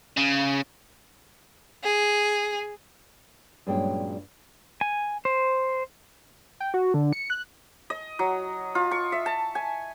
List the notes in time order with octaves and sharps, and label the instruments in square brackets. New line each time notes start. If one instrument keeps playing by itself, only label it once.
[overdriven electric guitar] C#3
[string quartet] G#4
[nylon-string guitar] G2 A#2 F#3 G#3 C#4 G5
[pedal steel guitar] G#5
C5
[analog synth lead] G5
F#4
D3
C#7
F#6
[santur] D#5
F#3
F4
C#6
E5
A5
G#5